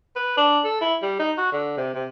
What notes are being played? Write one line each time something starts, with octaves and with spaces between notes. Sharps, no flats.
B4
D4
A4
E4
G3
D#4
F#4
D3
C3
C3